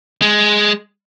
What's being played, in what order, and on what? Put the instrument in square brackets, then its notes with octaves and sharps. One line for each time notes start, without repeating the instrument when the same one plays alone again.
[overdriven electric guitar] G#3